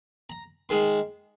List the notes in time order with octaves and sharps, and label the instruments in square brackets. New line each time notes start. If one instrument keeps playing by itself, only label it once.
[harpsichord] A#5
D#3 G#3 C6